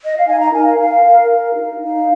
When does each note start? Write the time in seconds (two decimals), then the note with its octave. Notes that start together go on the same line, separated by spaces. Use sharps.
0.04 D#5
0.16 F5
0.27 D#4 G#5
0.40 A#5
0.52 A#4 G#5
0.65 F5
0.78 A#4 F5
1.04 A#4
1.29 A#4
1.56 D#4
1.81 D#4 F5